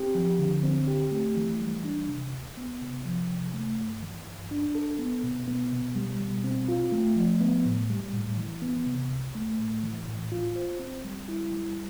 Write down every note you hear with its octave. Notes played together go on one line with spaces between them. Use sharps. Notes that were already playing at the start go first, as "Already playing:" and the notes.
Already playing: C4 G4
F3
D3
C4
G4
A3
E3
G3
D4
C3
D2
B3
C3
F3
C3
A3
G2
E3
G2
D4
A4
B3
B2
B3
B2
G3
B2
C4
F4
A3
F3
B3
A2
G3
A2
E3
B3
C3
C2
A3
A2
E3
A2
F4
C5
C4
G3
E4
G3